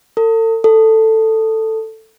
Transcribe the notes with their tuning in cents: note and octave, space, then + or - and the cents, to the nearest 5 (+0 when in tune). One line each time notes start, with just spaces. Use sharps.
A4 +40
A4 +10